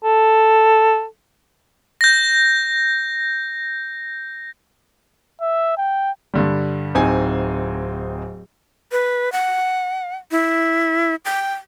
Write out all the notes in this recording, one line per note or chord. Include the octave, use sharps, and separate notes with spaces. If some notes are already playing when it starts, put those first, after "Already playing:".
A4
G6 A#6
E5
G5
G2 D3 G3
D1 C4 D#4 D#5 G#5
B4
F#5
E4
G5